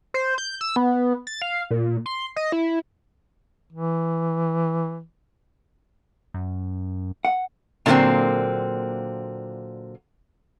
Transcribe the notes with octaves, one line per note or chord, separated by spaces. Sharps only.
C5
G6
E6
B3
A6
F5
A#2
C6
D#5
E4
E3
F#2
F#5
A#2 D3 F#3 A3 A#3 C4